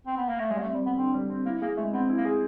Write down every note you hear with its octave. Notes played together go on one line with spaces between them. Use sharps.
C4
B3
A#3
A3
G3 G#3
A#3
A3
C4
G3
F2 B3
D3 C4
G3
C4
A#3 E4
A#3 G#4
G#3 A3
B3 C4
E4
A#3
G#4